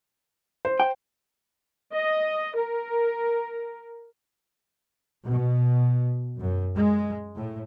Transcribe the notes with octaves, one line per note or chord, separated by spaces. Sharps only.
C5
G5
D#5
A#4
B2
F#2
G#3
A2